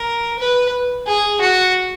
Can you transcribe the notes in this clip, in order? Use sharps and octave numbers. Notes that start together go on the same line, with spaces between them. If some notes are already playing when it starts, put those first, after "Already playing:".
Already playing: A#4
B4
G#4
F#4